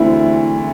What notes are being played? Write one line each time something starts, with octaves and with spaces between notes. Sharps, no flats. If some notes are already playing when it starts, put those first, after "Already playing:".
Already playing: E1 D2 D3 A3 C4 E4